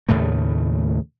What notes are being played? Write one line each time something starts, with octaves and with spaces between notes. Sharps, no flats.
D#2 A2 C#3 A3